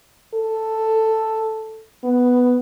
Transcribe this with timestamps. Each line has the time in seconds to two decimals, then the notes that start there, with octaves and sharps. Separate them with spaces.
0.34 A4
2.04 B3